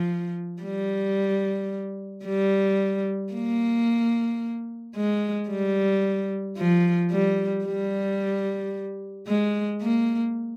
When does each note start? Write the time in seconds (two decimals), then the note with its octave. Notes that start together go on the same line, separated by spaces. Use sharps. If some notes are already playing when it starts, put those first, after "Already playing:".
Already playing: F3
0.63 G3
2.25 G3
3.33 A#3
4.95 G#3
5.49 G3
6.57 F3
7.11 G3
7.65 G3
9.27 G#3
9.81 A#3